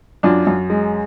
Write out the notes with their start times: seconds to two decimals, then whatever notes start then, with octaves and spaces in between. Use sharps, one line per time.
0.23 F#2 D4 F4
0.47 F#2
0.70 G#3